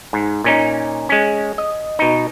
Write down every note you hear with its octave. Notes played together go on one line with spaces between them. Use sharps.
G#2
A#2 C#4 D#4
G#3 C#4
D#5
B2 D#4